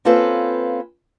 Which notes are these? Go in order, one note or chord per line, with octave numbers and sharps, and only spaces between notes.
A#3 C4 C#4 F4 A4 B4